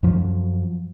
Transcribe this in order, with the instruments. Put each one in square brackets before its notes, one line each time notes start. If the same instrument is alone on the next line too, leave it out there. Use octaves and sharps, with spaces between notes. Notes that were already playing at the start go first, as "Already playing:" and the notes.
[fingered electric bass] F#2 F3 F#3